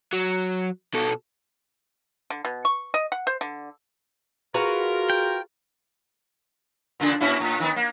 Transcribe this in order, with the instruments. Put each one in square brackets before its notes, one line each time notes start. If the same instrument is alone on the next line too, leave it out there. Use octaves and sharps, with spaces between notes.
[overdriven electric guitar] F#3
B2 A4
[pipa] D3
B2
C#6
D#5
F#5
C5
D3
[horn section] F4 A#4 [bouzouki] F#4 B4 A#5 [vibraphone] G#4
[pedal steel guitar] G5
[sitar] A#2 C#3 D4
A#2 C#4 E4
A2
D#3 B3
A#3